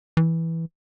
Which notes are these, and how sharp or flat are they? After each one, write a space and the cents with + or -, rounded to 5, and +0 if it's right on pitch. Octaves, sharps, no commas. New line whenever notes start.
E3 -5